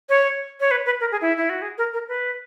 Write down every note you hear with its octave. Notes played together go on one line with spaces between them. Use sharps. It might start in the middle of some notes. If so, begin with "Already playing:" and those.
C#5
C#5
B4
B4
A#4
G#4
E4
E4
F#4
G#4
A#4
A#4
B4